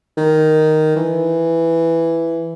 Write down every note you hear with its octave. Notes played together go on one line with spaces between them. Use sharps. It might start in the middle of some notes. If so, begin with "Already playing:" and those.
D#3
E3